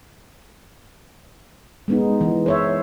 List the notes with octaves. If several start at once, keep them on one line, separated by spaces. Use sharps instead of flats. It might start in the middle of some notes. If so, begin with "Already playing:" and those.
G#3 B3 D#4
E3
C5 C#5 E5